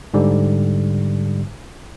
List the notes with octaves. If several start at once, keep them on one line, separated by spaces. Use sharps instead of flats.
G#2 D3 G3